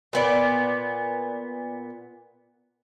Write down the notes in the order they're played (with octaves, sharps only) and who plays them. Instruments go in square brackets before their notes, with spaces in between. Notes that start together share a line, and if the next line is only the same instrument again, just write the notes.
[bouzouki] A#2 B3 D5